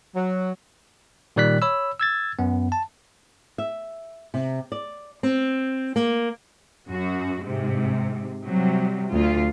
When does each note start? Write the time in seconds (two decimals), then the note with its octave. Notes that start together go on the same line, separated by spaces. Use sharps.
0.15 F#3
1.36 A#2 D#3 G3 D5 F#6 B6
1.62 C#5 B5 E6
2.00 E6 G#6 A6
2.39 F#2 B3
2.72 A5
3.58 E5
4.34 C3
4.72 D5
5.23 C4
5.96 A#3
6.89 F#2 F#4
7.44 G#2 C3
8.46 C3 F#3 G3
9.12 D2 F4